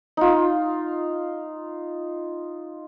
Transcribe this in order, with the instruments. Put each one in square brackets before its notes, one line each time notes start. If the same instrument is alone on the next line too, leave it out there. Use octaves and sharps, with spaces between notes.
[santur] D#4 F4